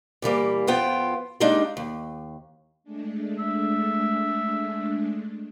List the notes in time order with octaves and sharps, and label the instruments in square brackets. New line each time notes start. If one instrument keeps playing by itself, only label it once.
[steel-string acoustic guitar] A#2 E3 G3 A#3
F2 B3 F4 G5
G3 G#3 A#3 D4 D#4
D#2
[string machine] G#3 A3 D4
[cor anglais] E5